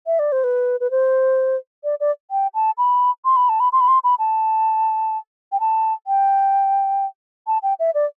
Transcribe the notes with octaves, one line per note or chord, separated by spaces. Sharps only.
E5
D5
C5
B4
B4
C5
D5
D5
G5
A5
B5
C6
B5
A5
B5
C6
B5
C6
B5
A5
G5
A5
G5
A5
G5
E5
D5